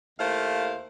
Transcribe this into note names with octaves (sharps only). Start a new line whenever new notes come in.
D#2 A3 A#3 E4 C5 F5